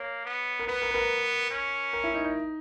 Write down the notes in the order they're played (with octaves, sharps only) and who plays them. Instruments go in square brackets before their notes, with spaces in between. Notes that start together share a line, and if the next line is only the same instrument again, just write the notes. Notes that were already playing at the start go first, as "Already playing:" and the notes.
Already playing: [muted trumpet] A#3 [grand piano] C#5
[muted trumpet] B3
[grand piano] A#4
[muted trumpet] B3 [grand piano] B4
[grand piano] A#4
B4
A#4
[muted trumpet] C#4
[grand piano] A#4
E4
D#4
D#4